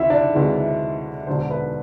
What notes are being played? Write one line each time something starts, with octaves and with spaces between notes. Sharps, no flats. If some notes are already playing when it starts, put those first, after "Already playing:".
Already playing: D2 C3 E3 E4 E5
D4 D5
D2 C3 E3 G#3
E1 D2 D3 C5
B4